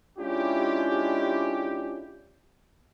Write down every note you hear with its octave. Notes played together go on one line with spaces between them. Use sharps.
G#3 C#4 D4 E4 F4 G4